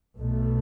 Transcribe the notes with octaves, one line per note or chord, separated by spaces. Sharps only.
B1 B2 A3